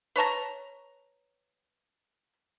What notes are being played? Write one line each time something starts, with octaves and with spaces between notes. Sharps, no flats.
B4 C#5 A5 A#5